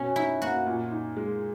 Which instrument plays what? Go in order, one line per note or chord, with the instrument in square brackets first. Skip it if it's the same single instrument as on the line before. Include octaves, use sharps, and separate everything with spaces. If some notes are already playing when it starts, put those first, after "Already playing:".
Already playing: [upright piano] B2 [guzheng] C#4
[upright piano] D#4 [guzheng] E4
[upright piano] A#3 [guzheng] F#4
[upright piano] A#2
D#4
G#3